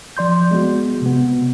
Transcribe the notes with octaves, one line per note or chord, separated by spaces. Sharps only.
F3 D5 C6 G6
G#3 B3 F#4
C3 B3